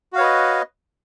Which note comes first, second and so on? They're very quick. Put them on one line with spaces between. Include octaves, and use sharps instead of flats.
F#4 F5 C#5 B4 D#5